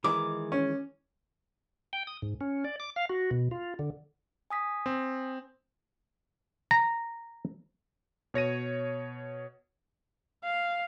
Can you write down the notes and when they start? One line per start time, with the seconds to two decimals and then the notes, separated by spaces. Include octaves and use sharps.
0.04 D#3 E3 G#3 D6
0.52 C#4
1.93 G5
2.07 D#6
2.22 G#2
2.41 C#4
2.64 D5
2.80 D6
2.96 F5
3.09 F#4
3.31 B2
3.51 F4
3.79 D3
4.50 G#5 D#6 B6
4.86 C4
6.71 A#5
8.34 B2 C#5 A#6 D#7
10.44 F5